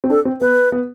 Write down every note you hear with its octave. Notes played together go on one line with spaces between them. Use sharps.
C4
D4 A4
C4
B3 B4
B3